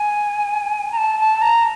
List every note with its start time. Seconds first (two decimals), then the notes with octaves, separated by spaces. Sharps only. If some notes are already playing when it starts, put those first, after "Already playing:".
Already playing: G#5
0.92 A#5
0.98 A5
1.20 A5
1.42 A#5